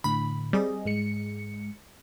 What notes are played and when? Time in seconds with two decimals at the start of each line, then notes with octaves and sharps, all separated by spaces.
0.04 A2 D3 B5
0.53 G3 C4 G#4 D#5
0.85 G#2 G#3 C#7